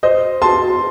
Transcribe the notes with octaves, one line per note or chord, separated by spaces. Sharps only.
C5 D#5
A5 C6